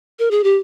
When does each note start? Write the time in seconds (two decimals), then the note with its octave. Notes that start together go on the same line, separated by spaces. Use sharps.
0.19 A#4
0.31 G#4
0.44 G4